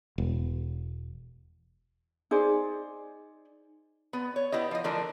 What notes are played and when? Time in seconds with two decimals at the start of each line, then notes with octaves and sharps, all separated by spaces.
0.18 E1
2.31 D#4 G#4 C5 D5
4.13 B3
4.36 C#5
4.52 B3 E4 G4 D#5
4.71 F3 D#5
4.84 D3 E3 F3 A3 D4 A#4